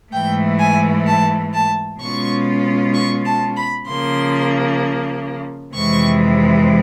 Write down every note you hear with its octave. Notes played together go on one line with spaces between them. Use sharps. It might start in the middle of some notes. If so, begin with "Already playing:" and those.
G#2 E3 A3 G5
G#5
A5
A5
B2 G#3 C#4 F4 C#6
C#6
A5
B5
C#3 F3 A#3 C6
F2 C3 E3 G#3 C#6